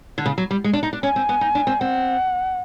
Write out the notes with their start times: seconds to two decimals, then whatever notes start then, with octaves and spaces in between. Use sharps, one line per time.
0.18 D3
0.26 C#3
0.38 F#3
0.51 G3
0.64 G#3
0.73 D4
0.83 D#4
0.93 D4
1.03 C#4 G#5
1.16 C4
1.29 B3
1.41 D#4
1.55 D4
1.67 C4
1.80 C4 F#5